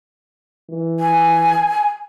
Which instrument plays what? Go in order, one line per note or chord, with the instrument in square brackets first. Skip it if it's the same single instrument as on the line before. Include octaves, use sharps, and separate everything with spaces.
[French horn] E3
[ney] G#5